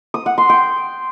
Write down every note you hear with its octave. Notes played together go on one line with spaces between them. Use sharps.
D#6
F#5
C6
G5